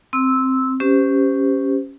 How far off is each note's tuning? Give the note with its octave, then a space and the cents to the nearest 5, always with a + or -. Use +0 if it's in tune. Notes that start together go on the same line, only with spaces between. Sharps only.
C4 +0 E6 -10
C#4 +0 G4 +0 C5 -30